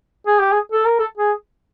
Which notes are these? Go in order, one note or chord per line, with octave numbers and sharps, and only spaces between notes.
G#4
G4
G#4
A4
A#4
A4
G#4